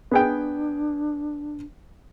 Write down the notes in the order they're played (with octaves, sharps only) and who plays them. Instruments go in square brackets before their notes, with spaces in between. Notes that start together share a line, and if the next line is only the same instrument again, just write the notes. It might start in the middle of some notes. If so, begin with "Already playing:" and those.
[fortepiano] B3 G#4 G5 [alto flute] D4